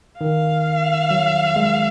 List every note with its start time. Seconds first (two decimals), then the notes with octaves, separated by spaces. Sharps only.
0.20 D#3 F5
1.11 F#3
1.56 G#3